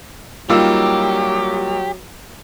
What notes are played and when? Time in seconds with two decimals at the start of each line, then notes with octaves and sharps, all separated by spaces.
0.50 F#3 G3 A#3 D#4 F4 G4 E6